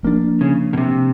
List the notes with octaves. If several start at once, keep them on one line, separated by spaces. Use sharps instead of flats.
F3 A#3 D4
C#3
B2
C3